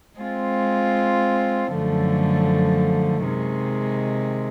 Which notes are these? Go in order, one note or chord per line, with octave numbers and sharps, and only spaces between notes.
G#3 C4 F4
F#2 D3 F3 A3
C3 D#3 G#3